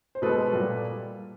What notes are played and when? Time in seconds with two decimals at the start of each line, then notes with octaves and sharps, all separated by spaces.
0.15 C5
0.22 B2 G#3 A4 B4
0.53 A#2 G3